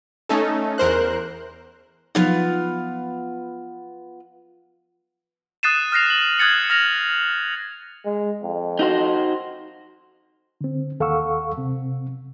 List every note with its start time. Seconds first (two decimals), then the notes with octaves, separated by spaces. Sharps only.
0.29 A3 C#4 D#4 A4
0.78 E2 A#4 C5 F#6
2.15 F3 F#3 B3 D#4 F4 F#5
5.63 D#6 F#6 A6 C7 D#7 E7
5.92 F6 F#6 A#6 C7 F7
6.10 F#7
6.39 D#6 F#6 G#6 A6 C#7
6.70 F6 A#6 F7
8.05 G#3
8.43 F2
8.79 D#4 F#4 C5
10.61 D3 C4
11.00 D#2 A4 F5 F#5 C#6 E6
11.58 C3 C4